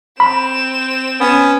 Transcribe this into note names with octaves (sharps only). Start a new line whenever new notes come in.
C4 B5 E7
B3 C#4